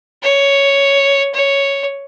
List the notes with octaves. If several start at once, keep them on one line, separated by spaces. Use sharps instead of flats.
C#5
C#5